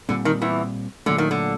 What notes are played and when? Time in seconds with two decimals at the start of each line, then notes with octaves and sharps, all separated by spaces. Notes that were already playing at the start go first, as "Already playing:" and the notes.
0.09 A#2 D3 G3 C4
0.25 D#3
0.42 E2 E3
1.06 A#2 D3 F#3 A3
1.18 D#3
1.31 D3